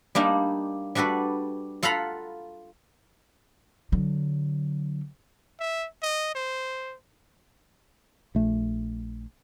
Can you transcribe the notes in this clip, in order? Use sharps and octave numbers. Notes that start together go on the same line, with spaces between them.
G3 A#3 D4 D#4
G3 D4 F#4 A4 B4
F4 A4 F5 F#5 A#5 B5
D3 F#3
E5
D#5
C5
A#1 A3